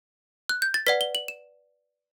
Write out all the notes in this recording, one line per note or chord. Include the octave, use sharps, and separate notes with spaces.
F#6
G6
A6
B4 D5 F#5 B6
G7
F#7
E7